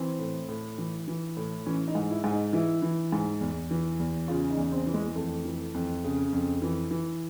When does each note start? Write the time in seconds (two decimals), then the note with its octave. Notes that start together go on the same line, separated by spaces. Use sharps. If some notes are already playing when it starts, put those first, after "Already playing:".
Already playing: E3 C4
0.19 A2
0.49 A2
0.78 E3
1.08 E3
1.37 A2
1.66 E3 C#4
1.88 D#4
1.95 G#2
2.10 E4
2.24 G#2
2.32 D#4
2.53 E3 E4
2.82 E3
3.12 G#2
3.41 E2
3.71 E3
3.99 E2
4.28 C#3 F4
4.50 D#4
4.57 E2
4.72 C4
4.87 E3
4.94 G#3
5.15 F2 A3
5.45 E3
5.74 F2
6.04 C#3
6.33 F2
6.62 E3
6.91 E3